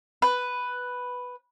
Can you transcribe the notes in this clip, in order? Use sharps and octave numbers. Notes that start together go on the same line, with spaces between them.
B4